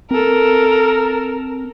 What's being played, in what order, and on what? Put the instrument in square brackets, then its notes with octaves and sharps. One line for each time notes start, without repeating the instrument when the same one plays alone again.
[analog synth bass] C4 [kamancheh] A4 A#4